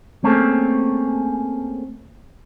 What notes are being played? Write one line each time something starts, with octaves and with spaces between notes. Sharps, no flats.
A3 A#3 C4 C#4 G#4 A4